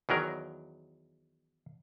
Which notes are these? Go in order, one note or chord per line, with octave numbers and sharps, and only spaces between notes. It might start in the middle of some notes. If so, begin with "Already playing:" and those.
E2 D#3 F#3 A#4